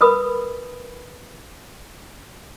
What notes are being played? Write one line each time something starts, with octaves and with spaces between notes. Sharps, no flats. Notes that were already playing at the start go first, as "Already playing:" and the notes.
A#4 B4 B5 D#6